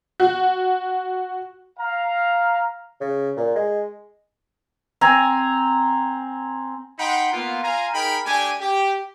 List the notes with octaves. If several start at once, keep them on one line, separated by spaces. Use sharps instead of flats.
F#4
F5 A#5
C#3
A#2
G#3
C4 G#5 A#5
D#4 F#5 G5 B5 C6
A#3 B3 F4
F4 F5 G#5 A#5
D#4 G#4 A#4 G5 B5
A3 D4 G4 G#5
G4